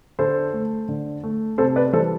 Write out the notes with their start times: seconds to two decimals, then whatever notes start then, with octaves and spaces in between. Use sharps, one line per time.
0.19 D3 A4 C5
0.54 A3
0.89 D3
1.24 A3
1.58 C3 A4 C5
1.76 B4 D5
1.93 E3 A4 C5
1.96 G3